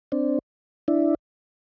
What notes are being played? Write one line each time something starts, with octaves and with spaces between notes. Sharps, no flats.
C4 D4
D4 E4